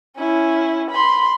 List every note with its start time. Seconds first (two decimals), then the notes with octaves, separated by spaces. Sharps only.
0.18 C#4 E4
0.91 B5 C6